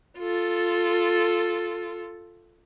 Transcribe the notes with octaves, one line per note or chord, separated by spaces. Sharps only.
F4 A4